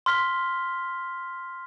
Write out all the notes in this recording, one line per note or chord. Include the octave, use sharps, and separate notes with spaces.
C6 F6 B6 G7